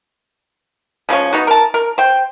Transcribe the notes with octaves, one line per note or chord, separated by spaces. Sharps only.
C#3 F3 G#3 C#4
B3 D#4 F#4
A#4 A5
A#4
C5 G5